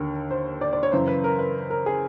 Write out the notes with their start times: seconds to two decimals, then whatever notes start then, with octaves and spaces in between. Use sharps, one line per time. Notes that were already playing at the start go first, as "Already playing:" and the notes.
Already playing: D#2 D3 A#4
0.31 C5
0.61 D5
0.73 D5
0.83 C#5
0.92 F#2 C#3 E3 C5
1.08 B4
1.24 A#4
1.39 B4
1.70 A#4
1.86 G#4